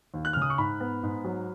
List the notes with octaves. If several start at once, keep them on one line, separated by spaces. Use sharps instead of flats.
D#2
F#6
F6
C#3 D#6
C#6
G#2 B5
B3
G#2
F#3